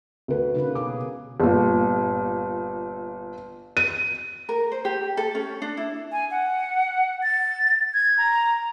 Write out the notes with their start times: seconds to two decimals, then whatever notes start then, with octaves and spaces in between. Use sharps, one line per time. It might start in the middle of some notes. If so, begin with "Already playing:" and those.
0.28 D2 B4
0.55 C#3 A#3 D#4 B4
0.75 B2 G#4 D6
1.40 G1 A#2
3.77 D#7
4.49 A#4
4.72 C5
4.85 G4
5.17 A4
5.35 C#4
5.62 D4
5.77 E4
6.12 G#5
6.31 F#5
7.23 A6
7.94 G#6
8.18 A#5